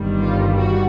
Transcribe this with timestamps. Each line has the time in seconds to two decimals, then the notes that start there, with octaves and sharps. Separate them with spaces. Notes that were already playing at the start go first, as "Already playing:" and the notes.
Already playing: G1 G2 D#3 G3
0.21 F4
0.58 F#4